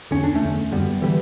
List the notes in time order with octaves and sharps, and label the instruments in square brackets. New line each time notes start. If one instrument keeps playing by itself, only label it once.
[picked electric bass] E2 D3 C#4
D4
A3 C#4
E2 D3
F#2 D3 G3 B3
D3 E3 G3